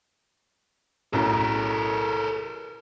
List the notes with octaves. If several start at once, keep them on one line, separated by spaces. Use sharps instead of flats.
B1 F#2 A2 A4 A#4